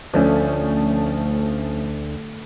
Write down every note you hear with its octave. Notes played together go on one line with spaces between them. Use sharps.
D2 F3 A3 C#4